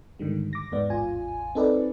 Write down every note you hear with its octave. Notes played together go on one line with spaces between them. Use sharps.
G#2 D3 D#3 G3
D6 A#6
E2 G#2 B3 D5
A1 E2 F4 G#5
C4 D#4 A4 B4 D5